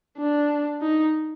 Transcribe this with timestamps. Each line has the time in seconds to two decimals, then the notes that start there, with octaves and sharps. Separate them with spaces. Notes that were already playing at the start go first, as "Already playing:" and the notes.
0.18 D4
0.81 D#4